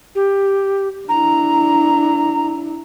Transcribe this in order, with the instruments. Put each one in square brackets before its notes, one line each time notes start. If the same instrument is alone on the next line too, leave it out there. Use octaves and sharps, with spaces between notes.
[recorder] G4
[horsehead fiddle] D4 E4 [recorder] A#5